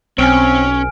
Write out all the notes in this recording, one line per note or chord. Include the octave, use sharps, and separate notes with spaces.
B1 C4 C#4 G#5 F6 D7